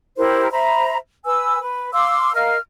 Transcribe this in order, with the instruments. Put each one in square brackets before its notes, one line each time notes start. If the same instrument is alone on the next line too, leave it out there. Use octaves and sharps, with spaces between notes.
[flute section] E4 G4 A#4 C5
C5 E5 A#5 B5
B4 G#5 E6
B4
F5 C6 D6 E6
A#4 D#5 F5 F6